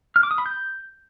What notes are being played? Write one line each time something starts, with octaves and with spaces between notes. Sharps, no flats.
F6
D6
D#6
B5
G6